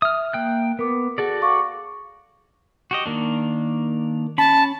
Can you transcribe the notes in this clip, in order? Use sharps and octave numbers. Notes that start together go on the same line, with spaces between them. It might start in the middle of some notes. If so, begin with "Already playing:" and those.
E5 D#6 F6
A#3 G5 F#6
B3 A#4 D6
F#4 G#4 A4 D5 F#5
F5 C#6 D6
F#4 G4 D#5
D#3 A#3 D4
C#4 A5 B5